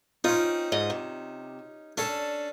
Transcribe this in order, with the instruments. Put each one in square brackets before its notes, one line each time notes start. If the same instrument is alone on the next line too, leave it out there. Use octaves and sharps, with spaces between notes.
[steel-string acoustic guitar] C4 [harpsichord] C#4 D#4 [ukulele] F4
[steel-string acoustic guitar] G#2 D#5
C3
[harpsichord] C#4 A4 [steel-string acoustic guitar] D4